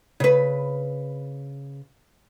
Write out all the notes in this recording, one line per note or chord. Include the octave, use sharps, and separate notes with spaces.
C#3 B4